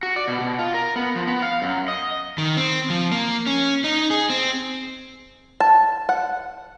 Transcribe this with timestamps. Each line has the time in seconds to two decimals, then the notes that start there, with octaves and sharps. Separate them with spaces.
0.03 F#4
0.16 D5
0.28 B2
0.41 B2
0.59 F4
0.74 A#4
0.96 B3
1.16 F3
1.27 B3
1.42 F5
1.62 F#2
1.88 D#5
2.38 D#3
2.57 C4
2.90 F3
3.12 A#3
3.47 C#4
3.84 D#4
4.10 G#4
4.30 C4
5.60 A5
6.09 F#5